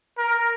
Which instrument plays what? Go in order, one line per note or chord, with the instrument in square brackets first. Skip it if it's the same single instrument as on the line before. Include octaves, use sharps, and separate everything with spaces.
[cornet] A#4